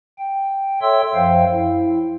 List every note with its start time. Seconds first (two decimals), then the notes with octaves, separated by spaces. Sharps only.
0.18 G5
0.82 A4 C#5 E5 G5 C6 E6
1.14 F#2 F3 C5 F5 G5
1.52 E4